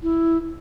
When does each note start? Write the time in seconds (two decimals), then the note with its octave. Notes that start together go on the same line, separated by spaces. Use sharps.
0.03 E4